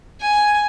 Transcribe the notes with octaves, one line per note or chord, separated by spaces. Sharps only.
G#5